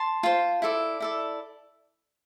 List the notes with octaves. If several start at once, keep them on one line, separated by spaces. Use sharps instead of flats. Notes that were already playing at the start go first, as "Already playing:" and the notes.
Already playing: A5 C6
F4 C5
E4 A4 D5
E4 A4 D5